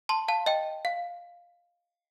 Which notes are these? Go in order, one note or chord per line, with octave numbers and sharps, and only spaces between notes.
A5 C6
F5 A5
D#5 G5
F5